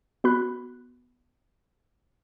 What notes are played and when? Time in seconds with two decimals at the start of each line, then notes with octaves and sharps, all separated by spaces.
0.24 B3 F#4 B5 F#6